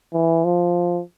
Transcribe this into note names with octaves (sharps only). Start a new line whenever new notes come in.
E3
F3